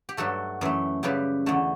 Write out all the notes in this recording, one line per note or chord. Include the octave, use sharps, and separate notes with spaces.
G4
G2 F#3 A3 F#4 A4
F#2 E3 A3
F#2 C#3 G3 G4 B4
E2 D3 A3